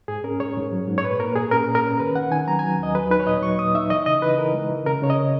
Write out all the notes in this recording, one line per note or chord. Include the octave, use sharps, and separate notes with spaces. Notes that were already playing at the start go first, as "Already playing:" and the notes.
G#2 G#4
C#4 A#4
G#2 C#5
G#2
F#3
G#2
C#5
A#2 B4
A#3 A#4
A#2 G#4
C#4 A#4
A#2
A#4
C#4
D#3 B4
D#3 F#5
D#3 G#5
F#3 A#5
F#3 G#5
D#2 D#5
F#3 B4
D#4 B4
C#5
A#2 D#5
F#3 C#6
A#2 D#6
D#4 E5
E3 D#5
C#3 D#5
E3 B4
E3 A#4
G#3
E3
C#3 A#4
C#3 C#5
D#5